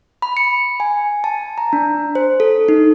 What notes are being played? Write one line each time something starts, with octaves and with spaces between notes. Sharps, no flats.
B5
C#7
G#5
A5
A#5
D4
C5
A4
D#4